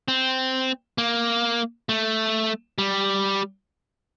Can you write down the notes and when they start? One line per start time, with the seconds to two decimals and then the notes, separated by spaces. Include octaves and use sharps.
0.08 C4
0.98 A#3
1.89 A3
2.78 G3